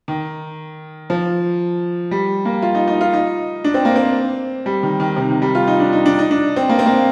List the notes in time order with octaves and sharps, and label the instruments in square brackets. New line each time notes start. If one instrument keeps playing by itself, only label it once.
[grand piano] D#3
F3
G3
A#3
F4
D#4
D#4
F4
D#4
D4
C4
A#3
C4
G3
D#3
D#3
C3
D#3
G3
F4
D#4
D4
D#4
D4
D#4
D4
C4
A#3
C4
A#3